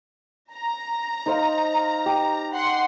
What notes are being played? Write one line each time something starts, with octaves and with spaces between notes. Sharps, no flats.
A#5
D#4 C5 F5
G4
F#5 C6